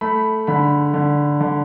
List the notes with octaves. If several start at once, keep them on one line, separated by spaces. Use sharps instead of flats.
A3 B5
D3 B5
D3
D3